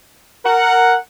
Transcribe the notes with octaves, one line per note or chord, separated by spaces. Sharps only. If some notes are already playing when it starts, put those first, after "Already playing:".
A#4 F#5